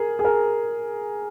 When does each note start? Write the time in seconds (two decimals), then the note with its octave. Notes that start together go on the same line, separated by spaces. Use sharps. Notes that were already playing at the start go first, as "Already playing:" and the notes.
Already playing: G#4 A#4
0.19 G#4
0.25 A#4